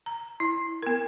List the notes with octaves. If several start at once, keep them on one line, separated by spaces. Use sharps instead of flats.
A#5
E4
B3 A#4